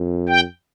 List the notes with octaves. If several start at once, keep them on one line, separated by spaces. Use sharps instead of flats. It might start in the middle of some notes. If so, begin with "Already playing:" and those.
Already playing: F2
G5